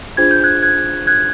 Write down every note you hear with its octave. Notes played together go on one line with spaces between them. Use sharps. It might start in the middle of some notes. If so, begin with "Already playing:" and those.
D4 F4 G#4 C5 G#6
G6
F#6 G#6
F#6 G#6
F#6 G#6